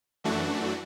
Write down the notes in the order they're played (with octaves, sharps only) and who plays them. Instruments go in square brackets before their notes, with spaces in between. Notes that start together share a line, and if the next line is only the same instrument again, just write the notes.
[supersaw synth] F#2 E3 A3 D4 F#4